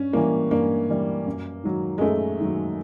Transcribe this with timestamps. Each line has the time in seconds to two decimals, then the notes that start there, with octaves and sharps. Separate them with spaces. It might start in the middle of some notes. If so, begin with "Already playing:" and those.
Already playing: G2 C#4
0.13 E3 G3 A#3
0.51 G2 A#3
0.89 E3 G3
1.27 F#2
1.64 D#3 F#3
1.98 G#3
2.01 F#2 A3
2.40 D#3 F#3